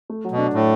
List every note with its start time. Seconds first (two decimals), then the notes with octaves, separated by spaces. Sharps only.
0.10 A3
0.25 F#3
0.32 B2
0.38 D4
0.54 A2